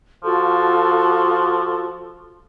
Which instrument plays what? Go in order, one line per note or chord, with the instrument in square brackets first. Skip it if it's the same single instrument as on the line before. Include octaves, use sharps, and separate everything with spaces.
[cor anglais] F3 [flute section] F4 F#4 A4